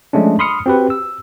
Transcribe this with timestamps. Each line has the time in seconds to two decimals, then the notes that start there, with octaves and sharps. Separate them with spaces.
0.13 F3 G#3 A3 C#4 D4
0.39 B5 C6 D#6 F6 C#7
0.66 C4 F#4 G4 B4
0.90 E6